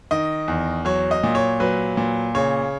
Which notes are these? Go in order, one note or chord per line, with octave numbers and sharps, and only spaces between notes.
D#3 D#5
E2
F#3 C#5
D#5
A#2
C#5
F#3 B4
A#2
C#3 C#5